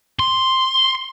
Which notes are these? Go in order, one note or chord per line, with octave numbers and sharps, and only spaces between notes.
C6